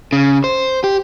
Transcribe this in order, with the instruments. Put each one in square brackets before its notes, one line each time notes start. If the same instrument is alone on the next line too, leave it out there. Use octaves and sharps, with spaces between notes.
[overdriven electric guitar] C#3
C5
G4